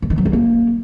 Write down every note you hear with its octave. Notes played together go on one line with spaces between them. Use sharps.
G2
D#3
F#3
D#3
A#3